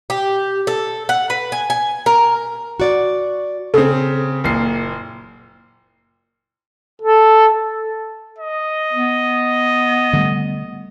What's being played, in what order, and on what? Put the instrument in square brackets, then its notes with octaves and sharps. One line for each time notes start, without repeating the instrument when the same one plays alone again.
[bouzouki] G4
A4
F#5
B4
G#5
G#5
A#4
[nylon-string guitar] F#4 D5
[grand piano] C#3 C4 [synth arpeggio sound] A4
[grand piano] F#1 A#2 C7
[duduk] A4
[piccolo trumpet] D#5
[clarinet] B3
[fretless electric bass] D3 G3 A3